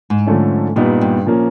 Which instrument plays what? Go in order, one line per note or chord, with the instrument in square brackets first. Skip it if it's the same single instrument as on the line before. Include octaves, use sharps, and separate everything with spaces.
[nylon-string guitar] G#2
[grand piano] D3 F3 A3 C#4
[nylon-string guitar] G2 [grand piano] A#2 G3 B3 D#4 G4
[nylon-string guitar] G2
[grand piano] A#2 F3 A#3 C#4